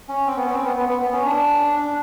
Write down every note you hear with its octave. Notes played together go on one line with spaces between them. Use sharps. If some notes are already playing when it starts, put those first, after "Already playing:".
C#4
C4
B3
C#4
C4
B3
B3
B3
B3
C#4
D4
D4